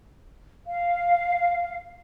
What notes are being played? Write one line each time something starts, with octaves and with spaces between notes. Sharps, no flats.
F5